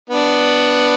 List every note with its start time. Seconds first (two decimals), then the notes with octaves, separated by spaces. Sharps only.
0.09 B3 D4